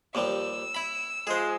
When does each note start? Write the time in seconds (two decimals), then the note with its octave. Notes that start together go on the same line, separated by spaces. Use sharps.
0.15 D#2 F3 G3 E6
0.75 E4 B5
1.27 F3 G#3 G#4 C5